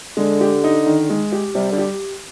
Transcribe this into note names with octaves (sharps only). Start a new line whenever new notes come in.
D3 G#3
G4
D#4
D#3
G#3
G4
C3 G3
D3
G4